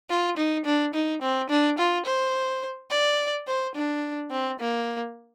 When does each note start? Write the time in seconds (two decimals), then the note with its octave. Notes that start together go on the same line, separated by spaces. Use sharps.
0.10 F4
0.37 D#4
0.65 D4
0.94 D#4
1.22 C4
1.50 D4
1.78 F4
2.06 C5
2.90 D5
3.47 C5
3.75 D4
4.31 C4
4.59 A#3